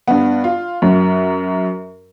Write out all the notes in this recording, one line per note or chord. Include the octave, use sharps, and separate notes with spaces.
G2 B3
F4
F#2 F#3